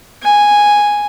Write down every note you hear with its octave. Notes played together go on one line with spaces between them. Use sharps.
G#5